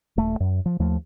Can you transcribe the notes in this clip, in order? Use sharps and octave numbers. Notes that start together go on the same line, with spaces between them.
D#1 A3
F#2
F3
D#2 F3 A3